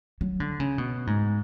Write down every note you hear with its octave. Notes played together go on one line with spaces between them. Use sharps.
F#3
D3
C#3
B2
G#2